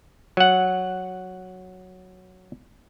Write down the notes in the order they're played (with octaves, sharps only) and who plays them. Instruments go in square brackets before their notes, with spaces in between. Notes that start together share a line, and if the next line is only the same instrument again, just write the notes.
[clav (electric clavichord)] F#3 F#5